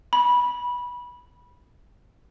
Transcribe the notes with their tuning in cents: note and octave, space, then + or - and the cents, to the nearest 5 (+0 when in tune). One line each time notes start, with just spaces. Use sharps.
B5 -15